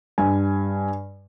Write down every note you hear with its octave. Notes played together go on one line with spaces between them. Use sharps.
G2 G#5